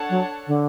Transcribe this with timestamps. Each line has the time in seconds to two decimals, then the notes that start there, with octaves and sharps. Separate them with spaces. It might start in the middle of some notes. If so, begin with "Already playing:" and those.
Already playing: D4 A4 C#5 F#5 A5
0.10 F#3
0.47 D3